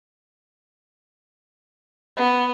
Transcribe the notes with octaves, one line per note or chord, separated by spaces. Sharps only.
B3